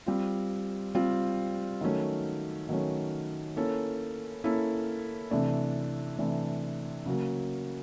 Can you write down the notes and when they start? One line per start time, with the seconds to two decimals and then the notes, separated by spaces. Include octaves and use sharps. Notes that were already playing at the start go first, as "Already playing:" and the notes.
0.06 G3 C4 F4
0.95 G3 C4 F4
1.81 D#3 F#3 A3 C#4
2.69 D#3 F#3 A3 C#4
3.56 A#3 C#4 E4 A4
4.44 A#3 C#4 E4 A4
5.31 C3 E3 A3 D4
6.18 C3 E3 A3 D4
7.06 C#3 F#3 A#3